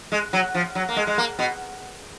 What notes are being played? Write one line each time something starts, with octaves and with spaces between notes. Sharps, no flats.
G#3
F#3
F3
F#3
A#3
G#3
G#3
A#3
B2